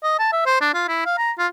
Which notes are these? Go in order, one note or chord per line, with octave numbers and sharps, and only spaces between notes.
D#5
A5
E5
C5
D4
F4
E4
F5
A#5
F4